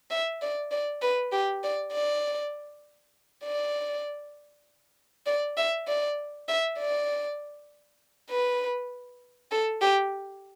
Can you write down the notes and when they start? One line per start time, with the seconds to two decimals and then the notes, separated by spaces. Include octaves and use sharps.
0.11 E5
0.41 D5
0.71 D5
1.02 B4
1.32 G4
1.63 D5
1.92 D5
3.44 D5
5.26 D5
5.57 E5
5.87 D5
6.48 E5
6.78 D5
8.30 B4
9.51 A4
9.81 G4